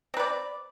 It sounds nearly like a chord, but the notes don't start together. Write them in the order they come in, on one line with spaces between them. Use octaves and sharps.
C4 B4 D5